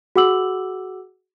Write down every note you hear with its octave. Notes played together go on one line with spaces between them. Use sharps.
F#4 G#4 F#5 D6 E6 F#7